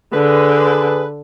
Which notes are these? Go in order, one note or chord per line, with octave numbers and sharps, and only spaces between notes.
D3 G#4 B4